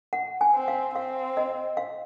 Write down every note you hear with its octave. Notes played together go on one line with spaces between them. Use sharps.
F#5
G#5
C4
F5
C4 F5
D#5
F5